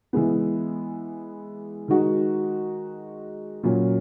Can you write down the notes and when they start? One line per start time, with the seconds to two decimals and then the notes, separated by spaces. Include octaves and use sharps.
0.13 E3 G#3 B3
1.88 D#3 G#3 D#4 F#4
3.63 A#2 F#3 C#4